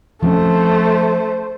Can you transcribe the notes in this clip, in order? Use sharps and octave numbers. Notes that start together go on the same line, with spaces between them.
F3 A3 C4 C#4 C5